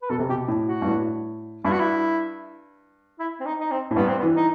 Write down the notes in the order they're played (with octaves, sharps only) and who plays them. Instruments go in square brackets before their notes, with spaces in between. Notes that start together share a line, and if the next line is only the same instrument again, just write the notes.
[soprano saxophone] B4
[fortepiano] B2 [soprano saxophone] A4
[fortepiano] C3
[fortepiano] B2 [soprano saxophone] G4
[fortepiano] A2
[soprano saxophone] F#4
[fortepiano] G2
A2
[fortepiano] G2 [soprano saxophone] E4
[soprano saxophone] F#4
E4
E4
C4
D#4
D#4
C4
[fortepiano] A2
[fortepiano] G2 [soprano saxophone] B3
[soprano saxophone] C4
B3
[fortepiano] E3
[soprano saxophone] D#4